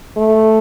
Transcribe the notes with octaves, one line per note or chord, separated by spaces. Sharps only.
A3